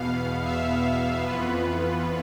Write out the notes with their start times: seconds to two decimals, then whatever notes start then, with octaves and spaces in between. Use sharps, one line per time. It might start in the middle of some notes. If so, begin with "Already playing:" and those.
Already playing: E2 B2 B3 F5
0.44 E5
1.23 F2 E3 B3 F4 B4